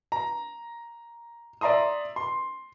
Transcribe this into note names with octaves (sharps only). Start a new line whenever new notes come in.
A#5
D5 E5 A#5 C6 D#6
C6